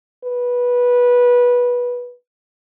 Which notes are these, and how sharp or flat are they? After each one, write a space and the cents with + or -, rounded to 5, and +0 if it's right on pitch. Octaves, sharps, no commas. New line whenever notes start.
B4 -15